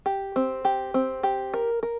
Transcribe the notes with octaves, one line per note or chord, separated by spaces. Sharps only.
G4
C4
G4
C4
G4
A#4
A#4